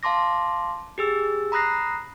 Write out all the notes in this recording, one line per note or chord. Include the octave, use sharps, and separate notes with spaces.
F5 A5 C6 D6 A#6
G4 G#4 E6
A#5 B5 D#6 F#6 A#6 C7